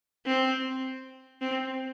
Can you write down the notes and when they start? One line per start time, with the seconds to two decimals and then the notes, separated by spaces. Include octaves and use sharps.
0.26 C4
1.42 C4